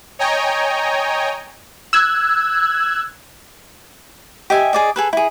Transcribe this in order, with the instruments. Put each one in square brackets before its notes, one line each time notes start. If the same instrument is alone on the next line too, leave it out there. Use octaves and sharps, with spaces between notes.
[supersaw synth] C#5 D#5 G5 G#5 A#5
[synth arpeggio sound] E6 F#6 G#6
[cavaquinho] G4 D#5 E5 G#5
G#4 D5 D#5
G#4 A4 B4
E4 G#4